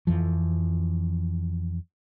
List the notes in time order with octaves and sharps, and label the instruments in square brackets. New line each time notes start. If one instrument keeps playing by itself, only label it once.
[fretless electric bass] F2 E3 F3